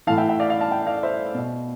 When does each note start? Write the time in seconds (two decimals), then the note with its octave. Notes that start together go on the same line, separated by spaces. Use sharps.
0.07 A2 E3 F5 A5
0.17 E5 G5
0.29 E5 G5
0.40 D5 F5
0.50 D5 F5
0.61 F5 A5
0.71 E5 G5
0.87 D5 F5
1.03 C5 E5
1.35 B2